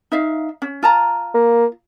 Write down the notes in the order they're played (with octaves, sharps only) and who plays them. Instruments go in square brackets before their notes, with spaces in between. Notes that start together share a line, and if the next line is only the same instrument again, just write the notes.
[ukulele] D#4 E5 F5
C#4
F4 A5 A#5
[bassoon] A#3